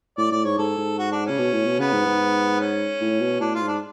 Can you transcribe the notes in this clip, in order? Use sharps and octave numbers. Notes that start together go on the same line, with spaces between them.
A2 D5
A2 D5
G#2 C#5
G#2 A4
G#2
F#4
D4
C#3 C#4
B2
A2
B2
C#3 B3
G#2
G#2
C#4
A2
B2
A2 D4
F4
G#2
D4